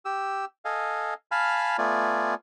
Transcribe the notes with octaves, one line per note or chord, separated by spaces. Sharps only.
G4 E6
A4 D#5 F5 G#5
F5 G#5 A5 B5 F6
A3 B3 F4 D5 G#5